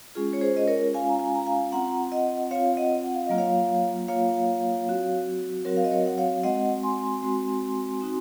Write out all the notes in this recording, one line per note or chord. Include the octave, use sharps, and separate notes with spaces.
G#3 C#4 F4 G#4
C#5
G#4 C5
D#5
A#4 C#5
G#3 C#4 F4 F5 G#5
A#5
F5 G#5
A#5
F5 G#5
C4 F4 F#5 A#5
D#5 F#5
C4 F4 C#5 F5
D#5 F#5
F#5
F5
F#3 A#3 F4 D#5
C#5 F5
F#3 A#3 F4 C#5 F5
F#3 C4 F#4
F#3 C4 F#4 A#4 C#5
F5
D#5
A#4 C#5
F#5
C#5 F5
G#3 C4 F#4 D#5 F#5
G#5 C6
G#3 C4 F#4
C4 D#4 F#4